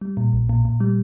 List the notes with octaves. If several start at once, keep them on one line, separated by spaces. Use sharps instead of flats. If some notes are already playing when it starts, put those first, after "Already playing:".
G3
A#2
A#1
A#2
A#2
G3